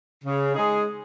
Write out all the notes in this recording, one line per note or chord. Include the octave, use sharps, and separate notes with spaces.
C#3
G#3 D#4 G#4